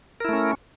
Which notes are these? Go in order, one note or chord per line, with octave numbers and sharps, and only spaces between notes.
A3 C#4 E4 A#4